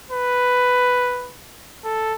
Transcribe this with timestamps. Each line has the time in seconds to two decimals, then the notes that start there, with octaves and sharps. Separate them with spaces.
0.11 B4
1.84 A4